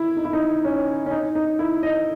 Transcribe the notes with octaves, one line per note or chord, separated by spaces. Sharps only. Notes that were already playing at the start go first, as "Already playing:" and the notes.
Already playing: E4
D#4
E4
D#4
C#4
C#4
D#4
D#4
E4
D#5